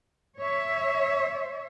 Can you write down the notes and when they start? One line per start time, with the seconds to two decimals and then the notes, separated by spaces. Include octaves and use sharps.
0.37 C#5 E5